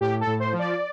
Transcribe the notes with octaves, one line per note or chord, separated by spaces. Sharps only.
A2 G4
A4
A2
C5
F3
D5